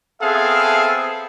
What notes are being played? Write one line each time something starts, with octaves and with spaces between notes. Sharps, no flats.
B3 C4 G#4 A4 E5 F5